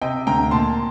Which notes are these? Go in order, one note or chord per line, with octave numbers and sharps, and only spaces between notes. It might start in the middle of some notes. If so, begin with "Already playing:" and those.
C3 D#5 G5
D2 G5 A#5
A#2 A5 C6